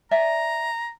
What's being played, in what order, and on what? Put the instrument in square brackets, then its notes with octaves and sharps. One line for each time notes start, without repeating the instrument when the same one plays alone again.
[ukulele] D5 E5 G#5 [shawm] A#5